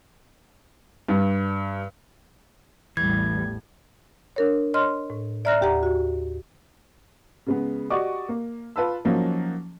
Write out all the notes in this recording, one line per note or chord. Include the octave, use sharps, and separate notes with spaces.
G2
A1 E2 A2 E3 G3 G#6
D4 A#4 C#5
C#5 D#5 C6 F6
A2
D5 E5 A#5 F6 F#6 A#6
D#2 G4 F#5 A#5
F#4
C#3 G#3 B3
F#4 G4 D5 D#5 C#6 D6
A#3
F4 B4 A5 B5 E6
F3 F#3 A#3 C#4 D#4